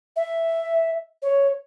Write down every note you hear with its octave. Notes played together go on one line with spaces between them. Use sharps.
E5
C#5